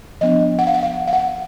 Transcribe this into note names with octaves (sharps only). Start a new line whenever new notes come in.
F3 B3 D4 D#5
F#5
F5
F#5
F5
F5
F#5